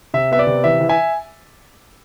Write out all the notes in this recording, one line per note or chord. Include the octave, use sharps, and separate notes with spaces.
C3 E5
B3 E5
D5
C3
E3 E5
E3
E5 G#5